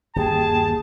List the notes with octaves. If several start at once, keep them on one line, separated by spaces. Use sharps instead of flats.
G1 D#2 A#3 G4 G#4 G5 A5